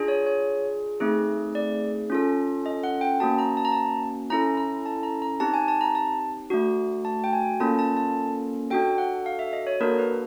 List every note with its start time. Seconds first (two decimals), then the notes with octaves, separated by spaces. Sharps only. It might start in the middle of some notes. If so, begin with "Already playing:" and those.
Already playing: D4 F4 G#4
0.08 C#5
0.26 C#5
1.00 A3 C4 D#4 G#4
1.55 D5
2.10 C#4 F4 A4
2.66 D#5
2.84 F#5
3.01 G5
3.20 A#3 C#4 F#4 A5
3.39 A#5
3.57 A5
3.65 A#5
3.72 A5
4.30 C#4 E4 A4 A#5
4.57 A#5
4.86 A5
5.03 A#5
5.22 A#5
5.40 C4 D#4 G4 A5
5.54 G#5
5.68 A5
5.81 A#5
5.95 A5
6.50 A3 D4 F#4
7.05 A5
7.24 G5
7.33 G#5
7.60 A#3 C#4 F4 A4 A5
7.79 A5
7.97 A5
8.70 D4 F#4 A4 G5
8.98 F#5
9.26 F5
9.39 E5
9.53 D#5
9.67 C#5
9.80 A#3 D4 F#4 A4 A#4
9.99 B4